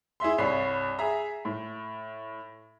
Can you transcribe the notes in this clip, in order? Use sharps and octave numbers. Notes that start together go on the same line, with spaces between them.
E4 G#4 E5 C6
C2 G2 C#5 C7
G#4 E5 A#5
A2